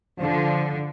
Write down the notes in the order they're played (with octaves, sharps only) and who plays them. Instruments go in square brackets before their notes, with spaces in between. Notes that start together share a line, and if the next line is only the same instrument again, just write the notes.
[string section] D3 [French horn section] F3